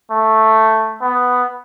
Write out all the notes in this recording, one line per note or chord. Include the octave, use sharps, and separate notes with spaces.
A3
B3